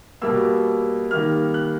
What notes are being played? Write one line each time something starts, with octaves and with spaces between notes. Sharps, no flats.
B2 G3 A#3 E6
D#3 G3 A#3 F6
F#6